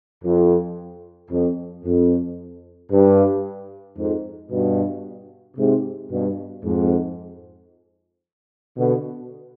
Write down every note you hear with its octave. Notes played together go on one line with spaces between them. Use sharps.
F2
F2
F2
G2
F2 G#2
G2 B2
G#2 C3
G2 B2
F2 G#2
B2 D3